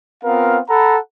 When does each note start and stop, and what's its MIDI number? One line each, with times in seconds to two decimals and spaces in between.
0.24 0.59 59
0.24 0.59 60
0.24 0.59 65
0.24 0.59 70
0.24 0.59 77
0.69 0.97 69
0.69 0.97 78
0.69 0.97 82
0.69 0.97 83